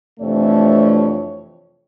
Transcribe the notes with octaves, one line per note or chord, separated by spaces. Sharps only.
F2 C3 E3 A3 D4 C#5